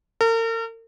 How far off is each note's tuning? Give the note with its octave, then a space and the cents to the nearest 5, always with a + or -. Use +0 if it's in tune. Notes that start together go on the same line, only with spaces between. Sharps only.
A#4 -40